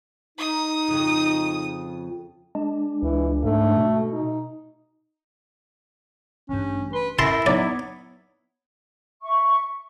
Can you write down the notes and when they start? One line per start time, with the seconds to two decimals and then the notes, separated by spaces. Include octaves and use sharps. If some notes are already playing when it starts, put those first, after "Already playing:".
0.38 D#4 D#6
0.88 F2 C#3 F3
2.55 G#3 D4
3.03 C#2 E3
3.44 G#2 A3
3.77 B2
4.13 D#4
6.49 A1 G2 C#4
6.93 B4 C6
7.19 F#2 E4 A5 C6 A#6 B6
7.46 F#3 B3 D#4 C#5 D5
9.21 E5 C#6